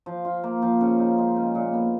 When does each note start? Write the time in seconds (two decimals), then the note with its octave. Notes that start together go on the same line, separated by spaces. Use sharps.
0.06 F3
0.25 F4
0.44 A#3
0.62 F3
0.81 C#3
0.99 D#4
1.18 G#3
1.36 C#3
1.55 A#2
1.74 B3